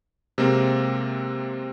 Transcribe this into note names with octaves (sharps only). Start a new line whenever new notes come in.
C3 G#3 A#3 C4 A#4